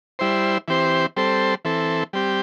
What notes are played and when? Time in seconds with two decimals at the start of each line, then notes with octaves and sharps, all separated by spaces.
0.19 G3 E4 C5
0.68 E3 C4 G4 C5
1.16 G3 C4 A4 C5
1.65 E3 C4 A4
2.13 G3 C4 G4